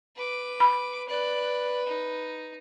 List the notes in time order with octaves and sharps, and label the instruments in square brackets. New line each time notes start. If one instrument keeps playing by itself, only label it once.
[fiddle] B4 D6
[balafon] B5
[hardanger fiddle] B4 [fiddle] D5 F#6
[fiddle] D#4